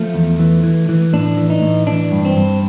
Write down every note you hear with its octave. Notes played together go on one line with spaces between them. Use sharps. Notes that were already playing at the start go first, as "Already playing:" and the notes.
Already playing: F3 A3
E2
E3
E3
E3
A2 D4
E3
D#4
A2
E3 D4
G2
C4
G2